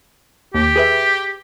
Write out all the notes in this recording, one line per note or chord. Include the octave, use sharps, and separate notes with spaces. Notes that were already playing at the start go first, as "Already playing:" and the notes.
D#2 G4
G#4 B4 E5